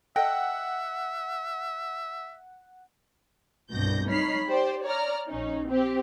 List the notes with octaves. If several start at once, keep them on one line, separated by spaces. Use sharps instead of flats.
A4 D#5 E5 F#5 G5
C2 G2 B2 G6 A#6
D#4 C#5 B5 F6 C7
G4 C5 D5
C#5 D5 A#5 F6
A#1 C#4 D#4
C4 G4